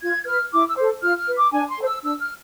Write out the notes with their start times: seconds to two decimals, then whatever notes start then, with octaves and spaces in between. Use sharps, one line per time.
0.01 F4 G#6
0.23 G#6
0.26 B4 F6
0.52 E4 D6
0.69 E6
0.77 A4 C5
1.02 F4 F6
1.19 F6
1.27 B4
1.36 D6
1.52 D4 G#5
1.69 C6
1.78 A4 C5
1.87 E6
2.03 D4 E6
2.20 F6